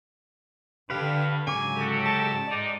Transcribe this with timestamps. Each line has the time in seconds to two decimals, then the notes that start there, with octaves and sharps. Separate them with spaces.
0.90 G2 D3 G4 B4 F5
1.47 G#2 C#3 F#3 G#3 G#5 D6
1.76 F#4 G4 A4
2.05 A5
2.48 C3 D#4 D5